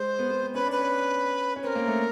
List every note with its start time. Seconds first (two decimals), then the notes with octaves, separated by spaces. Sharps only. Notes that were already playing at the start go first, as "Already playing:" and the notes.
Already playing: G#3 C5
0.19 B3
0.30 B3
0.42 C4
0.54 C#4 B4
0.66 D4
0.72 B4
0.79 C#4
1.56 C#4
1.63 C4 B4
1.67 A#4
1.75 A#3
1.87 A3